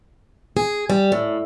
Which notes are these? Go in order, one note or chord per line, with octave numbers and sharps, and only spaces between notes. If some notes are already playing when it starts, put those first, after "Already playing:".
G#4
G3
A2